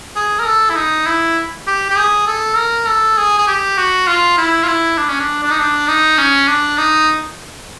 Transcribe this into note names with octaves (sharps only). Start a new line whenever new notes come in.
G#4
A#4
A4
E4
D#4
E4
G4
G4
G#4
A4
A#4
A4
G#4
G#4
G4
F#4
F4
E4
F4
E4
D4
C#4
D4
D4
D#4
D4
D#4
C#4
D4
D#4